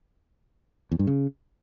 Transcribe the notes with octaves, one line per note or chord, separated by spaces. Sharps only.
E2
G2
C#3